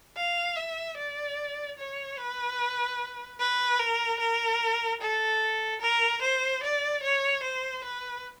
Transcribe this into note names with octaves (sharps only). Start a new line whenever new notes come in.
F5
E5
D5
C#5
B4
B4
A#4
A#4
A4
A#4
C5
D5
C#5
C5
B4